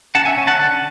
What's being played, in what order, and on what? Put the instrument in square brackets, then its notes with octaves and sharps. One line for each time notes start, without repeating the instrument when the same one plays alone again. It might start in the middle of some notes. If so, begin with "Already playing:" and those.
[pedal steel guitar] C#4 F#5 A5
E5 G#5
C#4
F#5 A5
D3